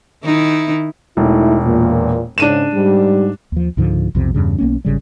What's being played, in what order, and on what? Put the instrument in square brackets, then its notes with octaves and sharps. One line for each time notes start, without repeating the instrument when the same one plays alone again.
[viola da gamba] D#3 D#4 E4
[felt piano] E1 [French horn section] A3 D#4 E4
[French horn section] E2 A#2
[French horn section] G#2 C#3 [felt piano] D4 D#7 E7
[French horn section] G#2 G3
[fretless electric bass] D#2 F3
C#2 G#2 D3 F3
B1 F2 C3
E2 G2 C#3
B1 A#3 B3 C#4
G#1 C#3 G3